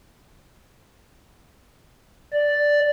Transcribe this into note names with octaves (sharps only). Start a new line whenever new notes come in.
D5